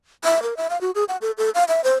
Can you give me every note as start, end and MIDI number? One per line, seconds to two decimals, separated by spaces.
0.24 0.43 76
0.43 0.57 70
0.57 0.68 76
0.70 0.80 77
0.81 0.91 66
0.95 1.04 68
1.09 1.17 78
1.22 1.31 69
1.38 1.50 69
1.55 1.64 77
1.68 1.83 76
1.84 1.97 72